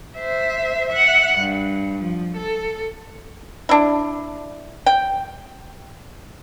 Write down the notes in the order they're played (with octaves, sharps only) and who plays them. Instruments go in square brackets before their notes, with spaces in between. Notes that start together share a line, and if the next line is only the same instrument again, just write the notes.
[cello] C5 E5
E5 F#5
G2
F3
A4
[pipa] D4 E4
G5